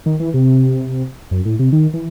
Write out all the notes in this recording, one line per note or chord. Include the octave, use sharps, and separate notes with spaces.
D#3
E3
C3
F#2
A2
C3
D#3
E3